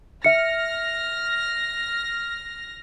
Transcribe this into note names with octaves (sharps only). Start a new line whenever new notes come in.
E5 F6 A#6 C#7